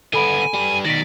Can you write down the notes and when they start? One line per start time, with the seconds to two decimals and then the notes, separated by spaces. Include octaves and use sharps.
0.14 D3 B3 A4 G#5 B5 D7
0.54 G3 B4
0.85 B2 D#3 D5 A#6 B6